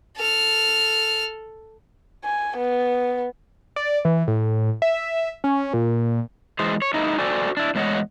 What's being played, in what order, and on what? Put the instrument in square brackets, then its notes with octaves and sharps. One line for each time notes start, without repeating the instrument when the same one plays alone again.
[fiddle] A4 F6
[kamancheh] G#5
B3
[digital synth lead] D5
E3
A2
E5
C#4
A#2
[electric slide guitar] E3 G#3 G#4 C5
C#5
G#3 A#3 D#4 E4
F#4 A4 C5 D5 G5 G#5
D4 E4
E2 A2 G#3 C#5 D#5 F#5